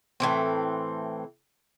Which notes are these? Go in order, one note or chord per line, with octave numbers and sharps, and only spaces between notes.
A2 E3 C4